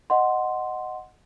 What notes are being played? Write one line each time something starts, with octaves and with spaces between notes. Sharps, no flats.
D#5 F#5 C6